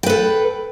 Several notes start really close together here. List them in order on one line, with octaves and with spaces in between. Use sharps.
G5 B4 A4